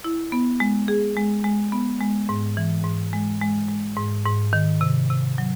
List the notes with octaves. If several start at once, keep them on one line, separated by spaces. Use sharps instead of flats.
E4
B3
G#3
G#4
G#3
G#3
B3
G#3
G#2
E3
G#2
G#3
G#3
G#3
G#2
G#2
D#3
C3
C3
F#3